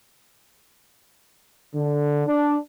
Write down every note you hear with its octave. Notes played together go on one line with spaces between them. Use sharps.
D3
D4